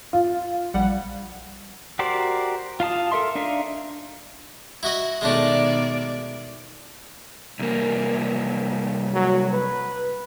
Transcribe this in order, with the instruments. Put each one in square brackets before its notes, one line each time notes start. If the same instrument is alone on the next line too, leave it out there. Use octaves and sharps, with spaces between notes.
[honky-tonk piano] F4
[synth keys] A#1 G3 F#5
[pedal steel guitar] F#4 G4 A#4 C5 D5
F4 F5 A5 D#6
A4 A#4 E5 C6
D4 D#4 E5 F5
[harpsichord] E4 F#4 D#5
[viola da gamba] B2 D#3 D5 [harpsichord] G#3 A3 D4
[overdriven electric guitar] C2 A#3
[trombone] F#3
B4